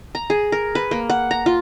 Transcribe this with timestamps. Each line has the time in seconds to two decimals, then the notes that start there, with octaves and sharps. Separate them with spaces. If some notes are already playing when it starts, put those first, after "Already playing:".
0.15 A#5
0.30 G#4
0.52 A#4
0.75 B4
0.91 A#3
1.10 F#5
1.31 A#5
1.46 F4